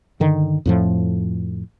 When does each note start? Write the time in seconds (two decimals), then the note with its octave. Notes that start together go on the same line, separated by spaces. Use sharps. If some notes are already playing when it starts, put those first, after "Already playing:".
0.20 G2 D3 D#3
0.66 F2 A2 F3